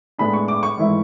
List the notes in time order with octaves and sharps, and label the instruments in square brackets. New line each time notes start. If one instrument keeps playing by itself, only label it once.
[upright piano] A2 G#3 B3 D4 B5
C#6
D6
C#6
G#1 G#2 E3 A3 E4